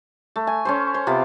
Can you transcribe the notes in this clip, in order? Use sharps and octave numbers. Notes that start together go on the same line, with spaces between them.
A3
G#5
C#4 A4 C5
C5
C3 B3 F4 D6